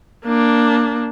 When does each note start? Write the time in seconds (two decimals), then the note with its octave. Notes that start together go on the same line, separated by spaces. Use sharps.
0.25 A#3 D4